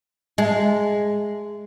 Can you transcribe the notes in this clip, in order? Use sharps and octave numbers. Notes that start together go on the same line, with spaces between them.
G#3